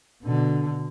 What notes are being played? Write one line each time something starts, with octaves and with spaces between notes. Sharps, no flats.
B2 D3